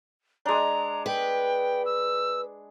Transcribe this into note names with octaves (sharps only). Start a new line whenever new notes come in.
G#3 D4 A#5
B4 G5
E6